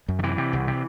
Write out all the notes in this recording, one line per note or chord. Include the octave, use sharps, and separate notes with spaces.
F#2
D3
C3 E3
C3
C2
C3